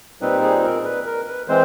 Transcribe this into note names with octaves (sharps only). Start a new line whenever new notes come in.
A#2 G3 C4 D#4 B4
G#4
A#4
B4
A#4
B4
E3 G#3 C4 C5